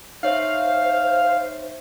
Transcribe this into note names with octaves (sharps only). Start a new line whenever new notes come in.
D#4 C5 C#5 E5 F5